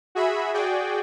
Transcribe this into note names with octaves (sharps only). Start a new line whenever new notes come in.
F#4 G#4 E5 B5
F#4 G#4 D5 G5